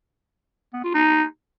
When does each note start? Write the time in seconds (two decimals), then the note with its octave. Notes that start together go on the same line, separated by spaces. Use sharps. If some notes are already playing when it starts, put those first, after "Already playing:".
0.74 B3
0.84 F4
0.94 D#4